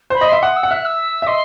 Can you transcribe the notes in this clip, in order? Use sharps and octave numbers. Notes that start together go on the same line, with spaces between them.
C5 B5
D#5
E5 C6
F#5 D#6
E6
F#5
E5 F#6
E6
E5
D#5 C6